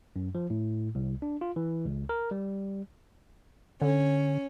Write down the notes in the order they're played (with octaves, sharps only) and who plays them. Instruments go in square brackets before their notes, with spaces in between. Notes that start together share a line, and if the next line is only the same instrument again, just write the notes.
[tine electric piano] F#2
F3
A2
C2
D4
F4
E3
C#2
A#4
G3
[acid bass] D3 [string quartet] C#4